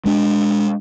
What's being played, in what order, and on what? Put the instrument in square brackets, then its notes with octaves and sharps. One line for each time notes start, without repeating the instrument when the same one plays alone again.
[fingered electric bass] G#3 D4